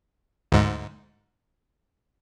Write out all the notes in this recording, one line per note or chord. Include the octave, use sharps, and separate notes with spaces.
D2 G#2